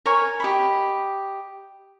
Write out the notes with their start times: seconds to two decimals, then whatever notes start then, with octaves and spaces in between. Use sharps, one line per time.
0.06 A#4 C#5 G#5
0.40 G4 D#5 B5